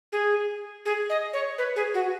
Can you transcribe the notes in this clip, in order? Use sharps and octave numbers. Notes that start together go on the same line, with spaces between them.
G#4
G#4
D#5
C#5
B4
G#4
F#4